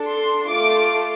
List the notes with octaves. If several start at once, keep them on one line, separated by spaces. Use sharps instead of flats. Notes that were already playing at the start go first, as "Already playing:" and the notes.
Already playing: D4 A4
C6
A3 F4 A4 D6